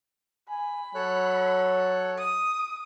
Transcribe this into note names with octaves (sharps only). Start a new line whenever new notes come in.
G#5 B5
F#3 A4 C#5 F#6
D#6